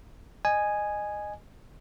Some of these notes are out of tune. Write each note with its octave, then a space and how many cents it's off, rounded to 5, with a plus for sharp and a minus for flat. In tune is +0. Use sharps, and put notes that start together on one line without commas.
D#5 -20 G#5 +0